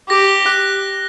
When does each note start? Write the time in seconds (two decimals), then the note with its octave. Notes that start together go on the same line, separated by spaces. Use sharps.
0.09 G4 A#6
0.28 G7
0.46 F#6